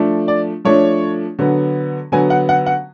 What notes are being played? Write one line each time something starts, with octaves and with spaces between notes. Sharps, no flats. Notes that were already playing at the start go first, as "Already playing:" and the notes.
Already playing: F3 A3 D4
D5
F3 A3 D4 C#5
D3 F#3 B3
D3 F#3 B3 G#5
F#5
F#5
F#5